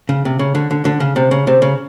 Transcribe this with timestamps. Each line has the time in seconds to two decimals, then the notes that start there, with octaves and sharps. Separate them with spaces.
0.09 C#3
0.25 C3
0.39 C#3
0.55 D3
0.71 D3
0.85 D3
1.00 C#3
1.16 C3
1.31 C#3
1.47 C3
1.62 C#3